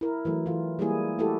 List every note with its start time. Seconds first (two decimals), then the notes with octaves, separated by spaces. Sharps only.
0.01 E4 A#4
0.25 E3 F#3 A3
0.46 E3 F4
0.79 G3 G#3 A#3 E4 G#4
1.19 A3 E4 F#4 G4 A4